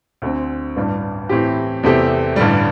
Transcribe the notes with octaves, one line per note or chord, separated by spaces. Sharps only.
D2 D3 C4
A1 G2 G3 D4
A2 E3 C4 G4
E2 C3 A3 C4 G4
A1 G2 D3 G3